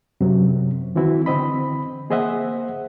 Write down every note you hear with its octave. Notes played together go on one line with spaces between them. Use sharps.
F#2 C3 F#3
D#3 E3 C4 E4 F#4
D3 C4 D#5 B5
A#3 G#4 C5 D#5 E5 F#5